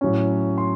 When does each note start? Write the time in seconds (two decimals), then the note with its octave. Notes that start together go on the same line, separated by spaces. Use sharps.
0.01 A2 F#3 C#4
0.58 C6